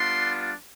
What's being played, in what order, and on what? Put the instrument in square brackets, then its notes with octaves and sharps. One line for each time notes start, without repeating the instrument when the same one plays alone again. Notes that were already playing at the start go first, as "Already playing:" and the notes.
Already playing: [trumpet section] G3 B3 D4 F4 C6